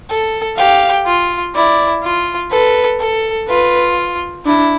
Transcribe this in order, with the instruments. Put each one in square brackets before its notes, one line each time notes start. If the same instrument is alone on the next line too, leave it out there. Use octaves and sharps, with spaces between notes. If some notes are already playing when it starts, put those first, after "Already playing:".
[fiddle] A4
[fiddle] G4 [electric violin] F5
[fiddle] F4
[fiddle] E4 [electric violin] D5
[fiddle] F4
[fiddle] A4 [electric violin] B4
[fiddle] A4
[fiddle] F4 [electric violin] B4
[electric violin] D4 [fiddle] E4